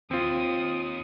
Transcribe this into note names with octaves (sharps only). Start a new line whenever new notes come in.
D#2 C4 F4 D#6